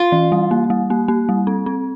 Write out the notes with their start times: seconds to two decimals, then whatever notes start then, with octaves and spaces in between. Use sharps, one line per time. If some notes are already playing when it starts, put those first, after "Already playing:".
Already playing: F4
0.12 E3
0.32 G3
0.51 A#3
0.70 G3
0.90 A#3
1.08 A#3
1.29 G3
1.47 C4
1.66 C4